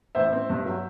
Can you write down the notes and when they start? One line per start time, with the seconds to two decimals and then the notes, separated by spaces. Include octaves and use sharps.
0.15 A1 C5 E5
0.33 C4
0.50 G2
0.66 F#3